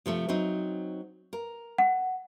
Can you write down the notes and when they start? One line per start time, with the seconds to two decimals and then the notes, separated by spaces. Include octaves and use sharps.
0.06 C3 F3 A3
0.29 F#3 C4 D#4
1.33 A#4
1.78 F#5